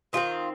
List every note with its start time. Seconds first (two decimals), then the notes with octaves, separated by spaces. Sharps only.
0.13 D#3 G#3 C4 F4